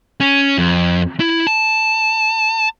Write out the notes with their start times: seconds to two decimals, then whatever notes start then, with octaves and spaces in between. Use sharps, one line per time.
0.20 C#4
0.58 F2
1.20 E4
1.47 A5